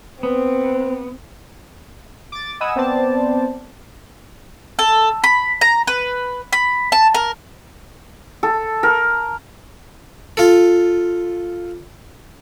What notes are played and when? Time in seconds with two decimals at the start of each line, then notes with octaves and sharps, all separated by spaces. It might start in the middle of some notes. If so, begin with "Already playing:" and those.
0.23 B3 C4
2.32 D6 A6
2.60 D#5 F#5 G#5 B5 D#6 E6
2.76 B3 C4 C5 D5 A5
4.79 A4
5.24 B5
5.61 A#5
5.87 B4
6.53 B5
6.92 A5
7.14 A#4
8.43 A4
8.83 A#4
10.37 F4 A4